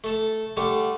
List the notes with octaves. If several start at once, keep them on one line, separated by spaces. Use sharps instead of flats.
A3 A4 A5
D3 G3 A3 C#6 D6